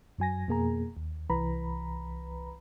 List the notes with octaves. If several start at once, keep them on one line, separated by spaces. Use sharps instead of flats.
F#2 F#3 G#5 A#6
F2 B2 A#3 G#4 G#5 A#5
D#2
C2 E3 B4 A#5 B5